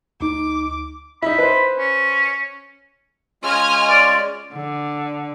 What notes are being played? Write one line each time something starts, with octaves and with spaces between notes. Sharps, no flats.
D2 D#4 D6
D#4 E4 B5
B4 C5
C#4
G#3 C#4 F4 D#5 G#5 F6
D5
D3